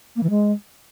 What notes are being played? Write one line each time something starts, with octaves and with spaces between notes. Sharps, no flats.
A#3
E3
G#3